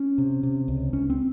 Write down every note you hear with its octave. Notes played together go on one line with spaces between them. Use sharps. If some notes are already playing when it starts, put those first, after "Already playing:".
Already playing: C#4
C3
C3
C#2
C#2 C#4
C4